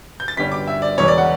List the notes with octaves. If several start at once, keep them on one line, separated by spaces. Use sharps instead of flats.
G6
A6
G1 G2 D3 G3 C#4 B6
D6
E5
D5
E1 E2 C#3 E3 C#5
D5
F#5